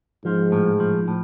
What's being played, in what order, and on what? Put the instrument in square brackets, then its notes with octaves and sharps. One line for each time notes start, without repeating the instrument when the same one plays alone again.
[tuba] G#2 [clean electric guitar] F3
[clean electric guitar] A2
F3
A2